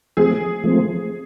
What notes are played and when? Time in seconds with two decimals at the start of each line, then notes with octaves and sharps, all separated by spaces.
0.17 F3 A3 C4 G#4
0.64 F3 A3 C4